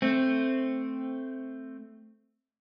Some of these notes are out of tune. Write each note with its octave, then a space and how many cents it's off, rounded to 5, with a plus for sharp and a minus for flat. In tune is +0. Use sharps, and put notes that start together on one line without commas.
A3 +0 C4 +0